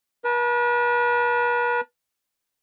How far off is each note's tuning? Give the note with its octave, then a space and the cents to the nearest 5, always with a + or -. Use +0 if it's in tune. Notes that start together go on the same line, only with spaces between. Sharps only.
B4 -40 A5 +0